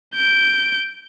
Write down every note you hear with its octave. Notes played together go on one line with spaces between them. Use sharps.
G6 D7